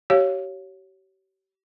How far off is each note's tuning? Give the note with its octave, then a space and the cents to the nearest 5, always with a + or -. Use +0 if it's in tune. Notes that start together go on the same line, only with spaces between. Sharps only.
G4 -40 C#5 +0 F5 +0